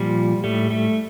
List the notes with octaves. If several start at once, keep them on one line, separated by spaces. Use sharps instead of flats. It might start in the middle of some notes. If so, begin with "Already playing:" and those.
Already playing: A#2 F3 G3
A2 G3 A3
A3